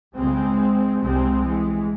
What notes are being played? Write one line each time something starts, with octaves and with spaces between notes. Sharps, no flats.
C#2 C#3 G#3 C4
C2 C3 G#3 C4
E3 G#3